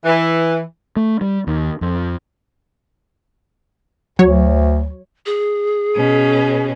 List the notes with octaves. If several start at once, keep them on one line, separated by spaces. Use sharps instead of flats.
E3
A3
G3
D#2
F2
D2 F#3 C#5
G#4
B2 C#4